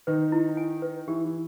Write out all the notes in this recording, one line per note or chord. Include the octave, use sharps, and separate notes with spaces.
D#3 D#4 B4
E4
G#5
B4
E3 E4 G4
E3 E4